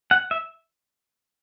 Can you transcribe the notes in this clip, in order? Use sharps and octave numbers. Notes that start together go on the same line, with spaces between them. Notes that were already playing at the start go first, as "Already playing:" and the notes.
F#5
E5